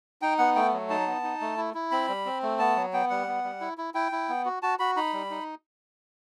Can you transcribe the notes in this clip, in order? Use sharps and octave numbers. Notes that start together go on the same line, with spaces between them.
D#4 G5
B3 F#5
A3 G5
F#3
D#4 A5
B3
D#4
A3
E4
E4
C4 B5
G3
C4
A3
B3 A5
F#3
B3 G5
G3 F#5
B3
G3
E4
E4
E4 G5
E4
B3
F#4
F#4 A5
F#4 B5
D#4 B5
G3
D#4